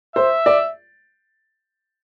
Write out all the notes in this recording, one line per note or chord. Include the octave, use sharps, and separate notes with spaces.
C5 E5
D5